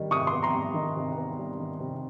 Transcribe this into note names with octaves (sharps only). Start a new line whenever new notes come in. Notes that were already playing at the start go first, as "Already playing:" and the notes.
Already playing: D#3 G3
C3 C#6 D#6
C6 D6
B3
A#5 C6
G3
D#3
C3
B3
G3
D#3
C3